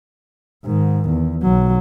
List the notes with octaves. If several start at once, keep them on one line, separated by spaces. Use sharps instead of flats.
G#2 D#3
E2
B1 F#3